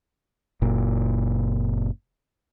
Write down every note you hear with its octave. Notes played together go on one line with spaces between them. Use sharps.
F#1 A#2